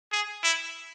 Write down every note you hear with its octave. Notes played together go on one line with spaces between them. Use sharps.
G#4
E4